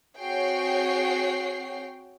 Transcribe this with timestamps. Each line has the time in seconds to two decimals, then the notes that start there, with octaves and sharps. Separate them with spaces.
0.18 C4 F#4 G#4 C#5 G5 C7